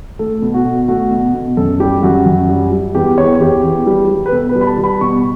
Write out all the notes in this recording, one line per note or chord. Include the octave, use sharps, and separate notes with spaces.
A3 A4
B2
F#4
B2
A3 F#4
B2
B2
F#2 A4
G3 G4
F#2 F#4
F#2
G3
G3
E2 G4
E2 C#5
E2 G4
E2
G3
G3
B4
B2 A4
B4
G3
B5
A5
G3
B5
B2 C#6